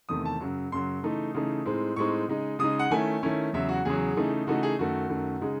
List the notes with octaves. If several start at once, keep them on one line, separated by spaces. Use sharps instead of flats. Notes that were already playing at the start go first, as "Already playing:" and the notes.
E2 C3 D#3 A3 D#6
A5
F#2 C#3 F#3
F#2 C#3 F#3 C6
C#3 E3 A3 D#4
C#3 E3 A3 D#4
A2 G#3 C4 D#4
A2 G#3 C4 D#4 C#6
C#3 G#3 D#4
C#3 G#3 D#4 D#6
F#5
D#3 A3 C#4 E4 G#5
D#3 A3 C#4 E4
E2 C#3 F#3 E5
F#4
E2 C#3 F#3 G#4
C#3 E3 A3 D#4
C#3 E3 A3 D#4 F#4
G#4
F#2 D#3 A3 F#4
F#2 D#3 A3
C#3 G#3 D#4